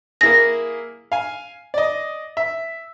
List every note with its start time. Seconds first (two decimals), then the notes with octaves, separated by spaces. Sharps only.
0.21 A#3 E4 G#4 A#6
1.12 F5 G#5
1.74 D5 D#5
2.37 E5